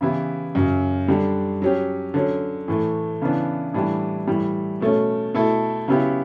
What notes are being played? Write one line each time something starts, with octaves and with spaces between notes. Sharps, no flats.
C#3 E3 B3 E4 G4
F#2 C#3 F#3
D3 G3 D4
F#3 C#4 G4
D3 F#3 C#4
A2 E3 A3
C#3 E3 B3 D4
A2 E3 G3 D4
A2 E3 G3
B2 A3 C#4
B2 A3 E4 A4
C#3 F#3 B3 E4 G4